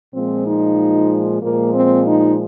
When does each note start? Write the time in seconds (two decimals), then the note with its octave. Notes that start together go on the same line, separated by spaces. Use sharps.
0.14 A#2 F3 G#3 C4
0.46 D#4
1.42 A#2 F3 G#3 A#3
1.74 C4
2.06 D#4